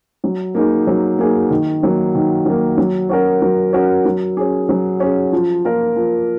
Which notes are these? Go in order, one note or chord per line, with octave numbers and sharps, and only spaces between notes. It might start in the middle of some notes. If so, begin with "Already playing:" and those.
F#3
A#3 D#4 G#4
F#3
A#3 D#4 G#4
D#3
F#3 A#3
D#3
F#3 A#3
F#3
C#4 F#4 A#4
F#3
C#4 F#4 A#4
F#3
C#4 G#4
F#3
C#4 G#4
F3
A#3 F4 A#4
F3